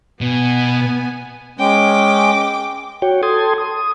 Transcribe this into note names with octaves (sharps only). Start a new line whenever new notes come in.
B2 B3 G#5
G#3 C#4 G5 D6
F#4 C#5 G5
A4 G5 A5 C6 D#6 G#6
D#6